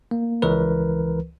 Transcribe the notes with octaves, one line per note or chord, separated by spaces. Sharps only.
A#3
C#2 E3 A#4 B4